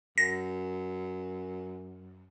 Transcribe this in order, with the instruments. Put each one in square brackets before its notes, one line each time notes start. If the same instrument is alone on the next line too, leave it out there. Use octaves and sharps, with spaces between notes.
[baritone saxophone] F#2 [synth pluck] A#6